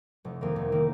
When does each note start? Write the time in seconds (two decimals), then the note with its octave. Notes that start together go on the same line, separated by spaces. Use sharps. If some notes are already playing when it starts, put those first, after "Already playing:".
0.25 F1
0.41 F2 D#3 A#3
0.56 F1
0.72 D#3 A#3